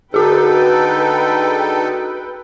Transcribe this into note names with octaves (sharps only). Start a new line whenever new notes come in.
D3 D#4 F#4 G#4 A4 B4 G5